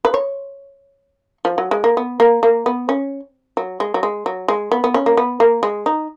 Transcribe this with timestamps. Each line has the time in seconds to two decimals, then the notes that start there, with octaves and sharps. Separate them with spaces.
0.05 B4
0.14 C#5
1.45 F3
1.58 F#3
1.71 G#3
1.84 A#3
1.97 B3
2.20 A#3
2.43 A#3
2.66 B3
2.89 C#4
3.57 F#3
3.80 G#3
3.94 F#3
4.03 G#3
4.26 F#3
4.48 G#3
4.72 B3
4.84 B3
4.94 C#4
5.06 A#3
5.17 B3
5.40 A#3
5.63 G#3
5.86 D#4